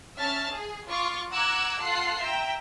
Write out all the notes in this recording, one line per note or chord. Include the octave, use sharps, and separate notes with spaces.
C#4 E5 A5 F6
G#4
F4 C#6 D6
F#5 A#5 D6 E6 F#6 G#6
F4 A4 F#5 F#6 C7
E5 G5 A#5